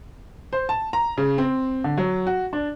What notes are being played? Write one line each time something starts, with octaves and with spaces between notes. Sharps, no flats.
C5
A5
A#5
C#3
C4
D3
F#3
F#4
D4